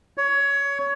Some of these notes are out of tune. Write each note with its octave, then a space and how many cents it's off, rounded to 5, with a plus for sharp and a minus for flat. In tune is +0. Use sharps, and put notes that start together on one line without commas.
C#5 +20